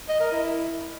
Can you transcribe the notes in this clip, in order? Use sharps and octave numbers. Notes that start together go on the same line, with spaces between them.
D#5
A#4
E4